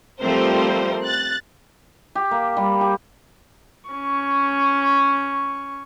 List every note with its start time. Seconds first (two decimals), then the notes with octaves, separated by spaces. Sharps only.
0.20 F3 G3 A3 C4 A#4 C5
1.03 F#6 A6
2.15 G4
2.31 A#3
2.57 G3
2.81 G4
3.90 C#4 C#6